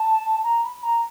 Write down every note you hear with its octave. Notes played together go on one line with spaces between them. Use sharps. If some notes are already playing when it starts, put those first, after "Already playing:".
Already playing: A5
A#5
B5
A#5